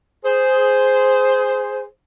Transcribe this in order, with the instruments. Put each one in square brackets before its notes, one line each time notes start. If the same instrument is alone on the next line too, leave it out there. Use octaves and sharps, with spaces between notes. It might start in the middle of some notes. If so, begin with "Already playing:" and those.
[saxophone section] G#4 C5